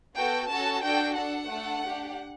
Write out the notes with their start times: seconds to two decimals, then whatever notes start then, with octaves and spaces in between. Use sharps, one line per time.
0.17 B3 F#4 A4 G5
0.50 C#4 F#4 A4 A5
0.84 D4 F#4 A4 G5
1.17 D4 A4 F#5
1.51 A3 D4 A4
1.85 D4 G4